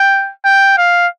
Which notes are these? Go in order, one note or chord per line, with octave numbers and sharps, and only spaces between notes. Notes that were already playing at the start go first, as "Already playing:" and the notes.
Already playing: G5
G5
F5